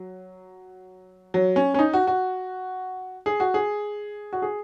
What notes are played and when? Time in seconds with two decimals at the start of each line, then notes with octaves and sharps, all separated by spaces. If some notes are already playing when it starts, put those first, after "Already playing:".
Already playing: F#3
1.34 F#3
1.56 C#4
1.74 C#4
1.79 D#4
1.94 F#4
2.07 F#4
3.26 G#4
3.40 F#4
3.54 G#4
4.33 F#4
4.42 G#4